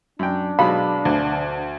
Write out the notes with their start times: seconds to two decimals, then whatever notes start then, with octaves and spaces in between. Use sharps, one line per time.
0.19 F#2 D4 G5
0.59 B2 F#3 G#3 F5 B5
1.05 D2